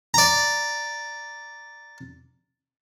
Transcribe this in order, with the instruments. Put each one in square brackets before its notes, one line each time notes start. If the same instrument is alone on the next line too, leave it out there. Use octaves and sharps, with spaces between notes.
[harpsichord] D5 A#5